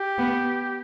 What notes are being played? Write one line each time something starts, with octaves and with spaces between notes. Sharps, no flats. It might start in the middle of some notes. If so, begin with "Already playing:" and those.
Already playing: G4
B3